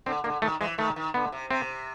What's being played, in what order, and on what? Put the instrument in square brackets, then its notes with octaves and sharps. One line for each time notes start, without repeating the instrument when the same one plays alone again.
[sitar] D3 [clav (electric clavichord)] C4
[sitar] D3 [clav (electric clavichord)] A#3
[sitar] D#3 [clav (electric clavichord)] A3
[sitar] E3 [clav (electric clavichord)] G#3
[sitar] D#3 [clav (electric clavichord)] A3
[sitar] D#3
[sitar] D3 [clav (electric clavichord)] B3
[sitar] C3
[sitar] C3 [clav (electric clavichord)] C4